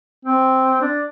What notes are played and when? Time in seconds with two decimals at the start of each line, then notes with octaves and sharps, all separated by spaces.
0.25 C4
0.81 D4